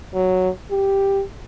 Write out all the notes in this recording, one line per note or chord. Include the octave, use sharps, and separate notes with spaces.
F#3
G4